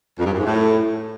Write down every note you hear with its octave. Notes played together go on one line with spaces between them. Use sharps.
F2
G2
F#2
G#2
A2